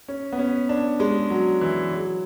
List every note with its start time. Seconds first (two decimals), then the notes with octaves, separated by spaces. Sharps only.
0.08 C#4
0.33 B3
0.39 C#4
0.69 D4
1.00 G#3
1.30 F#3
1.61 E3
1.92 F#3